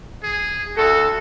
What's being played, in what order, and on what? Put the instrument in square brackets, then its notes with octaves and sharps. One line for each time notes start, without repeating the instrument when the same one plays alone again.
[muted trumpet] G#4
[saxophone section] D2 A4 [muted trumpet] F#4